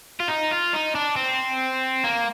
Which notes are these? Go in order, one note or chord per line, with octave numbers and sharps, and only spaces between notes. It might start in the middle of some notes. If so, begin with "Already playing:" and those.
F4
D#4
F4
D#4
D4
C4
A#3